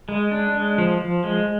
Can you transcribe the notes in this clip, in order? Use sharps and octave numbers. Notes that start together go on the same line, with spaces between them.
G#3
D4
G#3
F3
F3
G#3